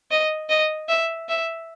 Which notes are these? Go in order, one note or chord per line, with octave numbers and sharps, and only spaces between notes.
D#5
D#5
E5
E5